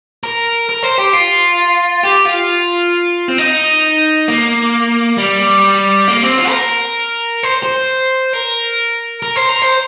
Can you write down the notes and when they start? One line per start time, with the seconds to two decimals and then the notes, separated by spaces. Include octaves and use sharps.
0.24 A#4
0.69 A#4
0.83 C5
0.98 G4
1.13 F4
2.04 G4
2.26 F4
3.28 C4
3.38 D#4
4.28 A#3
5.18 G3
6.08 A#3
6.23 C4
6.38 F4
6.49 C5
6.53 A#4
7.43 C5
7.63 C5
8.33 A#4
9.22 A#4
9.36 C5
9.49 A#4
9.62 C5